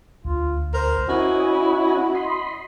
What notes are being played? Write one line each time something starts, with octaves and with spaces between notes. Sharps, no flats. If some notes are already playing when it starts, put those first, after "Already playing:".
D2 F4
A#4 C5
C#4 E4 F#4 D#5 G#5
D#5 B5 C6